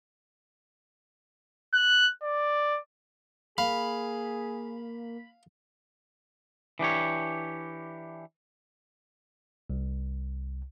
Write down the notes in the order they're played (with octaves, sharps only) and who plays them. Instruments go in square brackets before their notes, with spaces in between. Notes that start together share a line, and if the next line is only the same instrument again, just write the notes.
[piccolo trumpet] F#6
D5
[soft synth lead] A#3 [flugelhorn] G#4 [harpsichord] F5 [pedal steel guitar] B5
[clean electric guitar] E3 D4 G4 C#5
[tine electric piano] C2